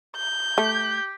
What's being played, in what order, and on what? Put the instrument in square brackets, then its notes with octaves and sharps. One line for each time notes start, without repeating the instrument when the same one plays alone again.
[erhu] G6
[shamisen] A3 [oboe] G4